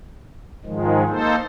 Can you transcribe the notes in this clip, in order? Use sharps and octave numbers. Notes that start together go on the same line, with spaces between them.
G#2 D#3 F3 G#3
A#3 D#4 A4 C5